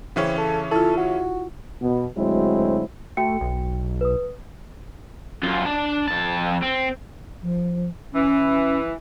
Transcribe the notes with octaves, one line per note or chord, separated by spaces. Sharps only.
C#3 E3 C4 C#4
A4
E4 F4 A4
F#4
B2 B3
D2 F#3 G#3 C4 E4 C5
A3 F#4 G5 C#7
B1
B4 D#6
F#2 F4
D4 A5
F2 A5
C4
F3
E3 C#4